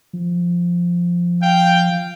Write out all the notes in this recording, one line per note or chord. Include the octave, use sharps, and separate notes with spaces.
F3
F5 G5